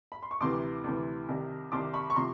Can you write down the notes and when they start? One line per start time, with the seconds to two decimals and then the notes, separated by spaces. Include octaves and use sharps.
0.12 B5
0.23 C6
0.31 C#6
0.41 D2 C3 E3 C6 D6
0.84 D2 C3 E3
1.29 C2 C3 D#3
1.72 C2 C3 D#3 C6 D6
1.93 B5 C#6
2.10 C#6
2.16 C3 F3 A#5 C6